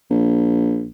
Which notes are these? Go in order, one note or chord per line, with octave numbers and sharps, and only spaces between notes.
A#1